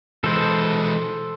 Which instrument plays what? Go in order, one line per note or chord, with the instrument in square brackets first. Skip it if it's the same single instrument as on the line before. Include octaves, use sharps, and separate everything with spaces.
[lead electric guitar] E3 G#3 [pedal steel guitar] A4 C5